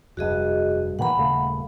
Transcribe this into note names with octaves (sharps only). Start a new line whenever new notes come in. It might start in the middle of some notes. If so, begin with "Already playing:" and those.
F1 G2 F#4 G#4 D#5
A#2 D#3 E3 F#5 B5
D#1 C#3 A3